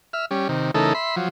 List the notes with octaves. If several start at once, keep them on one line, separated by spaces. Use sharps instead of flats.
E5 F6
G3 C#4
C3 D#3
C#3 E3 A3 D#4 A4 A#4
E5 B5 C6
F3 F#3